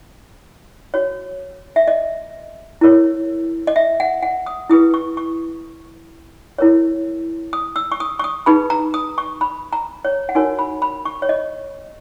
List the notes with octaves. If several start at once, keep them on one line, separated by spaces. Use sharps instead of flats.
F#4 C#5
E5
D#5
E4 A#4 C#5
D#5
E5
F#5
F#5
D#6
E4 G#4 B4 D#6
C#6
C#6
E4 A#4 C#5
D#6
E6
C#6
D#6
C#6
D#6
D#4 G#4 B4 B5
A#5
D#6
C#6
B5
A#5
C#5
F#5
D#4 F#4 A#4 C#5 G#5
B5
B5
C#6
C#5
D#5